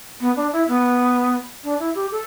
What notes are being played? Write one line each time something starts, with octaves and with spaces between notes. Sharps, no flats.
B3
D4
E4
B3
D4
E4
G4
A4